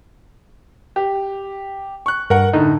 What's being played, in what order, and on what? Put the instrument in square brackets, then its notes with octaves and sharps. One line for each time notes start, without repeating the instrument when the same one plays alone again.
[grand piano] G4
C#6 F#6
[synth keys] G2 [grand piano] A#4 F#5
[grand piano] A2 D3 [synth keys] D#4